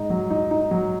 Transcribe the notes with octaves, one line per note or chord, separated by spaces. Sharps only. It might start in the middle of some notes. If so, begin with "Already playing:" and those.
Already playing: G#2 D#4
F#3
D#4
D#4
F#3